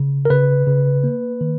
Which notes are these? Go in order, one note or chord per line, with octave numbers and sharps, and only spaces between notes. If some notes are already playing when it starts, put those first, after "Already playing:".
Already playing: C#3
A#4
C#3 B4
C#3
A#3
D#3